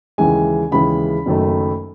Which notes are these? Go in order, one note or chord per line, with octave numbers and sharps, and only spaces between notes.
D#2 C#3 E3 G#3 G#5
D#2 C#3 E3 G#3 B5
F#1 F#2 D#3 A3